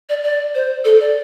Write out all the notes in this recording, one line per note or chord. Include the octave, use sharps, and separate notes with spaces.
D5
D5
C5
A4
D5